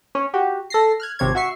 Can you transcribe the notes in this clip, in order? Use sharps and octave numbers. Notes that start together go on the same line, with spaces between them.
C#4
F#4 G4
A4 A#6 C7
F6 F#6 G#6
G#1 C3 C#5 G#6
F#4 E5 C#6 C7